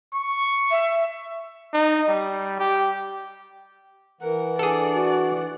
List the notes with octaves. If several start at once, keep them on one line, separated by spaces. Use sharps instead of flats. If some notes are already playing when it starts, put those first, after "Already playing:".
C#6
E5
D#4
G3
G4
E3 A#4 F#5
D4 G#4 A4 D5
F#4